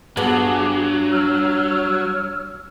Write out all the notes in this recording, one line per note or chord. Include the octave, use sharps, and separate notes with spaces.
G2 F#3 B3 G#4 D6
C#5 E6 F6